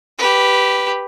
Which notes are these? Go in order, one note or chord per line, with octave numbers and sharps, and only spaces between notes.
G4 B4